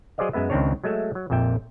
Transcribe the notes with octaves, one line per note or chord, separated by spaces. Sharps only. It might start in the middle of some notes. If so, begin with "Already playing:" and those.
F#3 G#4 C5 D5 D#5 F5
F#2 G#3 B3 B4 E5
C#2 D#3 C4 D4 C#5
F#3 G#3 A3 E5
F#3
A#1 F2 A#2 E5 G5